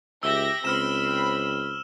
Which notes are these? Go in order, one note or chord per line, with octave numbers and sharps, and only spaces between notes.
C#2 G4 E5 E6 A#6 G7
C#2 C4 B5 E6 F6 E7